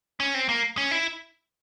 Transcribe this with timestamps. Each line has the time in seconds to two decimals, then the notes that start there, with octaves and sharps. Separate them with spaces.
0.20 C#4
0.34 C4
0.49 A#3
0.77 C#4
0.91 E4